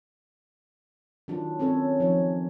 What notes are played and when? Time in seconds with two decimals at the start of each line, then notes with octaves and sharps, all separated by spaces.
1.28 D#3 F#3 D4 F4
1.59 C4 C#4 A4 C#5
2.00 F3 D#4 C#5